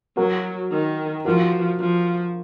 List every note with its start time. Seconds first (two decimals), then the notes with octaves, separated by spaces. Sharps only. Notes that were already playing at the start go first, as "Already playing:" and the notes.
0.17 F#3 F#4 A#4
0.71 D#3
1.25 F3 F#4 A#4
1.80 F3